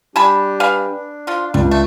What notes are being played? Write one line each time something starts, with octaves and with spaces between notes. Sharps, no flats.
G3 D4 G4 G#5 A5 B5
B4 F5 G#5
D4
F3 F4
C#2 G3
A3